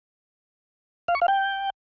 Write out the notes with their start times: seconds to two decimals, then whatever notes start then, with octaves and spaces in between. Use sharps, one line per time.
1.08 F5
1.15 C#6
1.22 F5
1.28 G5